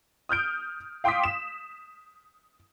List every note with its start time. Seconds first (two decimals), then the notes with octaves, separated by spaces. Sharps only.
0.29 D#6 F6 G6 D7
1.04 F5 G5 C6 D6 D#6 B6
1.24 E7